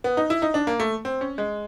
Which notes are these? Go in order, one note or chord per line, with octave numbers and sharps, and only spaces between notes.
B3
D#4
E4
D#4
D4
A#3
A3
C4
C#4
G#3